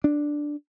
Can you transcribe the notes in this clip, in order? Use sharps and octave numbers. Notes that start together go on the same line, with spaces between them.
D4